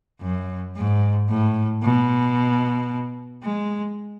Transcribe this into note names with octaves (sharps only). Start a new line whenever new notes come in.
F#2
G#2
A2
B2
G#3